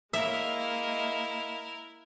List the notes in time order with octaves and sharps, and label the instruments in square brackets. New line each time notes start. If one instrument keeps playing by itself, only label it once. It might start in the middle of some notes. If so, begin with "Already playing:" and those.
[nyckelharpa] G#3 D#5 [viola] A#3 [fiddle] E4 A#4 [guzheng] E5